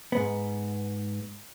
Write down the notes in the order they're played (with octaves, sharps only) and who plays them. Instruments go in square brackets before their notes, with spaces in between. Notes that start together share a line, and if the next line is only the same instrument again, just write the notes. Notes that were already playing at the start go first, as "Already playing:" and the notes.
[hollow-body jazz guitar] G#2 B3